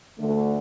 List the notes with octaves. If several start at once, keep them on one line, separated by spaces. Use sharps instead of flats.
D2 D3 A3